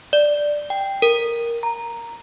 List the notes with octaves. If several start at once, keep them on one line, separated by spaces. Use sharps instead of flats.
D5
G5
A#4
A#5